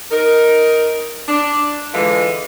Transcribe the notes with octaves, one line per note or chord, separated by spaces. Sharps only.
D#4 A#4
D4
D3 E3 G#3 F4